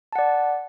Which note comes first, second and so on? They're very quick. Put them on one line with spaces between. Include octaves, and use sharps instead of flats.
A5 F#5 D5